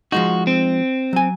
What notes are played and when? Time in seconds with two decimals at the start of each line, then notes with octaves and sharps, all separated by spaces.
0.12 F3 G#3 D#4 F#4
0.47 C4
1.13 F#3 G#5